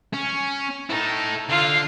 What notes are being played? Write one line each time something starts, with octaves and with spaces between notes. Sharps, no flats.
C#4
D#4 E4 A4
D3 F4 F5